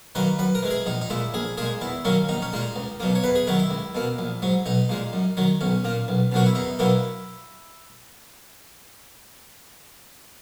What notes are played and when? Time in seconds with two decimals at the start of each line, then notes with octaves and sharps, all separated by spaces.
0.15 D#3 F#3 A#3 B4
0.39 F#2 B4
0.55 A#4
0.62 E3 G#3
0.70 G#4
0.86 A#1 D#4
1.01 D#4
1.10 A#2 G#3 E4
1.34 A#1 G#4
1.57 A#2 G#3 G#4
1.81 E2 E4
2.05 D#3 F#3 A#3 C#4
2.29 A#1 D#4
2.42 C#4
2.53 A#2 G#3 D#4
2.76 C#2
3.00 B2 F#3 A#3
3.15 C#5
3.23 E2 B4
3.35 G#4
3.47 D#3 F#3 E4
3.59 E4
3.70 C#2
3.95 B2 A#3
4.18 A#1
4.42 G#2 F#3
4.66 B1 D#4
4.89 A#2 G#3
5.13 F#2
5.37 D#3 F#3
5.61 B1 C#4
5.84 A#2 A#3
6.08 B1
6.32 B2 F#3 A#3 F#4
6.46 E4
6.55 E2 D#4
6.79 B2 F#3 A#3 E4